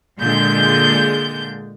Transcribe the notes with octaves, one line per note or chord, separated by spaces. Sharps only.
A#2 D3 G#3 G6